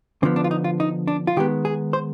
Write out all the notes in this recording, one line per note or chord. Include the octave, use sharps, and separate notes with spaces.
D3 F3 B3 C4
D4
F4
D#4
F4
D#4
D4
F4
D#3 G#3 B3 G4
G#4
C5